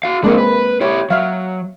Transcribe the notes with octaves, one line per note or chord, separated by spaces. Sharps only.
F#4 F5
G#3 A#3 C4 D4 G#4
B4
E4 G4 C#5
F#3 E5 F5